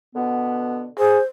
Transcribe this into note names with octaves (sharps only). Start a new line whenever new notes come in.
B2 D3 B3
G#4 C5